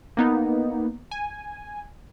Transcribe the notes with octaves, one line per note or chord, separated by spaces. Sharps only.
A#3 B3 D#4
G#5